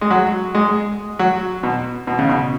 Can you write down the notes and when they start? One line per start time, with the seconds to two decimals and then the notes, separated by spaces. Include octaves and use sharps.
0.01 G#3
0.10 F#3
0.55 G#3
1.19 F#3
1.63 B2
2.07 B2
2.19 C#3
2.29 B2